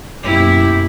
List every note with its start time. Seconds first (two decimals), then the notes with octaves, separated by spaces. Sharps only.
0.23 F#2 B2 A#3 E4 G4